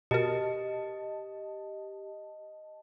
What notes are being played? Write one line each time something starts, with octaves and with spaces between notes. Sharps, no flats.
B2 G4 A#4 D#5 A5